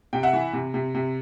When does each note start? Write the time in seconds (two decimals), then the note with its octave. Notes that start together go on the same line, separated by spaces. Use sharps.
0.13 C3 G5
0.23 E5 F#5
0.33 E3
0.53 C3
0.74 C3
0.95 C3